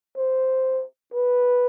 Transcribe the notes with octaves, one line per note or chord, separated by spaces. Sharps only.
C5
B4